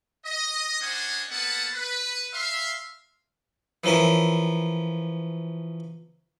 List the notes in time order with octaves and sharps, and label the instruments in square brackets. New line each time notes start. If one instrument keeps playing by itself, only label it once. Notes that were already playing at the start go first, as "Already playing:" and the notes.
[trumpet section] D#5
C#4 D4 C5 D#5 F#5 G#5
A#3 B3 A4 B4 F#5 A5
B4
E5 F5 C6
[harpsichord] E3 F3 C#4 A#4 E5